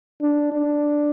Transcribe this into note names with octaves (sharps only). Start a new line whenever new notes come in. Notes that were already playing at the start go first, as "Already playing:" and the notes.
D4
D4